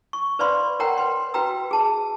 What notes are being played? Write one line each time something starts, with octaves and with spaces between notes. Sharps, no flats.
C#6
B4 C5 D5 F5 B5 C6
A#4 C#5 F#5 G5 A#5
B4 C6
F#4 B4 G5 A#5 E6
G#4 A5